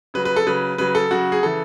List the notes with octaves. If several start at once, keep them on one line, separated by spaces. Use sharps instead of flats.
C#3 F#3 B4
B4
A4
C#3 F#3 B4
C#3 F#3 B4
A4
C#3 F#3 F#4
G#4
C#3 E3 A4